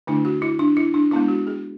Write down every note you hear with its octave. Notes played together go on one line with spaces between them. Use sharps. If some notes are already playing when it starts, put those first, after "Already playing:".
D3 A3 D4 E4
F#4
E4
D4
E4
D4
G#3 B3 D4 E4
F#4
G#4